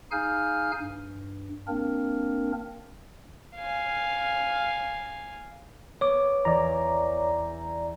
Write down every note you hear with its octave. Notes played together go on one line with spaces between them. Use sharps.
D#4 G#4 F5 G#5 F6 G6
G2
A#3 C4 D4 A#4
F5 G#5
B3 C#5 D6
E2 D5 A#5